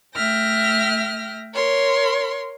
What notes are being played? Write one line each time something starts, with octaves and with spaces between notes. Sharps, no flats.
A3 E5 G5 F6 A#6
A#4 C#5 C6